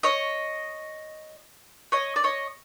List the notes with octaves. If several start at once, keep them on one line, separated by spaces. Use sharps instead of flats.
C#5 D#5
C#5 D#5
D5
C#5 D#5